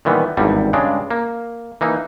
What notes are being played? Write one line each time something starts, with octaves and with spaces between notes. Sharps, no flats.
A#2 D#3 E3 G3 B3
G#1 E2 G2 G3
G2 C#3 G#3 D4
A#3
E3 A#3 D#4